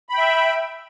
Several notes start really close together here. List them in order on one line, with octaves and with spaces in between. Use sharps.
B5 G5 E5